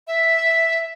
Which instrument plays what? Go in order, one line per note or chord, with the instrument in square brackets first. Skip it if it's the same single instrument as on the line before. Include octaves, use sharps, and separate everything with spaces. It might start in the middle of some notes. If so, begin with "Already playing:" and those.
[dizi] E5